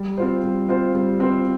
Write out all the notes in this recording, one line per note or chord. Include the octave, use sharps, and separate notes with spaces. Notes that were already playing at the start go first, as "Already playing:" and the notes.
Already playing: G3
C4 F4 C5
G3
C4 F4 C5
G3
C4 F4 C5